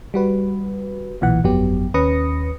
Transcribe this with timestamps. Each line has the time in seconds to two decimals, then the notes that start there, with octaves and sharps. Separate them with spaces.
0.14 G3 F#4 B4
1.21 B1 A#2 E3 F#5
1.44 G1 F2 F#3 B3 G4
1.94 D#2 C#4 B4 D#6 A#6 C#7